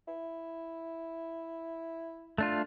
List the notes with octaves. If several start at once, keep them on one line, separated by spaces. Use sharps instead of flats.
E4
A3 D4 F4